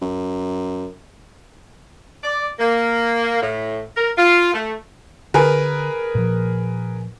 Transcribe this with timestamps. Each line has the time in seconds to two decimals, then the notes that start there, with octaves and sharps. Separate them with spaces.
0.01 F#2
2.22 D5
2.59 A#3
3.42 A2
3.96 A#4
4.18 F4
4.53 A3
5.34 D3 G#4 A#4 B4
6.15 A#2 F3